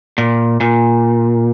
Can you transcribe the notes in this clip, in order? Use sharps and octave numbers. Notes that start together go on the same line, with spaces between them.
A#2
A#2